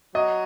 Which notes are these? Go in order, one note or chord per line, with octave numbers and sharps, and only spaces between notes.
F#3 D#5